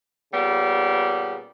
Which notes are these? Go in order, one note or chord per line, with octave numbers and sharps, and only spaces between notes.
A#2 C#3 G3 B3